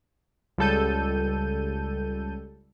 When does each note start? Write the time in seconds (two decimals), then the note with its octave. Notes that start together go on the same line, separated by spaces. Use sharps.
0.58 C#2 G3 A4 G6 D#7